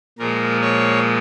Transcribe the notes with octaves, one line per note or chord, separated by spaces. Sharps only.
A#2 F3 G#3 A#4
C#5